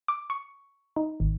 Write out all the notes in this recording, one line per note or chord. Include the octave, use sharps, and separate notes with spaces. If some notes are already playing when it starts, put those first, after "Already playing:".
D6
C#6
D#4
G#1